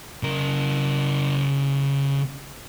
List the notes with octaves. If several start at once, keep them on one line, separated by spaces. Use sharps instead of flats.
C#3 A#4